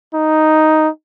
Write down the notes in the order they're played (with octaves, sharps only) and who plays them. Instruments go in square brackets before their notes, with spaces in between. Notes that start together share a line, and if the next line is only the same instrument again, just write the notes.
[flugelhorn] D#4